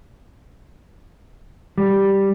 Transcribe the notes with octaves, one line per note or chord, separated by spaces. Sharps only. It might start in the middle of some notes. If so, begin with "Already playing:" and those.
G3